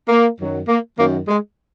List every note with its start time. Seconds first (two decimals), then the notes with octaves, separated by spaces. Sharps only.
0.09 A#3
0.38 F#2 D#3 F#3
0.68 A#3
0.97 F#2 D#3 F#3 A#3
1.27 G#3